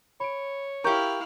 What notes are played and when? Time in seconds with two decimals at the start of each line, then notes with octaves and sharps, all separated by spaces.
0.20 C#5 B5 D7
0.84 E4 G4 A#4 F5 A#5 C#6 G6